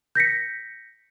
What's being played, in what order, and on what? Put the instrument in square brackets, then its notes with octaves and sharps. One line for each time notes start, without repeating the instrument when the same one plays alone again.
[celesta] G6 A#6 B6 C#7